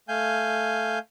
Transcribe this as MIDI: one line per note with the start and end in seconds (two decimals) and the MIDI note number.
0.08 0.99 57
0.08 0.99 77
0.08 0.99 80
0.08 0.99 91